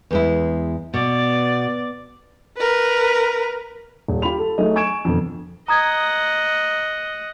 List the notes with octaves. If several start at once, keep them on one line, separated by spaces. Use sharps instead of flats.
E2 G#3 E4
B2 D5
A#4 B4
D#1
F4 G4 B5 F7
A4
F#3 A3 D#4 G#4 D#5
G#5 C#6 G#6 D7 E7
F2 B2 D3
D#5 F#5 A#5 D#6 G#6